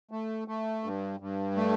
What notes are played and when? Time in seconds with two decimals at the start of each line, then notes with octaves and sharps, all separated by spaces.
0.11 A3
0.48 A3
0.84 G2
1.20 G2
1.56 A3